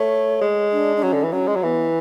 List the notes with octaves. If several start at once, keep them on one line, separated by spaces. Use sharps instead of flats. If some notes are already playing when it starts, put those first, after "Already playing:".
Already playing: A3 C#5
G#3
D4
D4
F#3 C#4
D3
E3
F#3 C#4
G#3
F#3
E3 B3